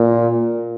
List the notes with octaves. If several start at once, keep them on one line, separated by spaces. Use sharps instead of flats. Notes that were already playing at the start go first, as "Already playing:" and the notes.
Already playing: A#2